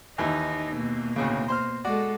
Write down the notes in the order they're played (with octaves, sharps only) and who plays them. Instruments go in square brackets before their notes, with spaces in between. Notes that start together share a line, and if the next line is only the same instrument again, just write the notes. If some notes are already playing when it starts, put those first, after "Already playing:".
[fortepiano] D#2 E3 E5 [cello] D#4
[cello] B2 A#3
[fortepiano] D2 A2 C#3
C5 C6 F6
[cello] G#3 A4 [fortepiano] F#4 D5